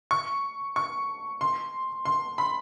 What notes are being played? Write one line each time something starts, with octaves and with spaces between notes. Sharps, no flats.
C#6
C#6
C6
C6
B5